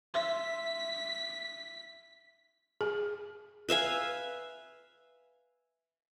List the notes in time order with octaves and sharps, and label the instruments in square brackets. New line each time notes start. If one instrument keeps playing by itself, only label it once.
[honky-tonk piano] E5 C6 [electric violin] B6
[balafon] G#4
[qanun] B4 E5 F5 G#5